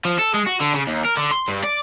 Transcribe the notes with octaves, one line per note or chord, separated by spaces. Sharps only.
F3
A4
G#3
F#4
D3
C#3
D#2
A#4
D3
C6
G2
D5